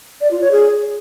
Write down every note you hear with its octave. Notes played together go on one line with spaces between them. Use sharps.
D5
F4
C#5
G#4